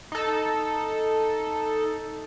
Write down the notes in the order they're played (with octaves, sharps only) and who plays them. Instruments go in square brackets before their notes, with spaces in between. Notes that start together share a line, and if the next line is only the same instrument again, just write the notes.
[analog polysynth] D#4 A4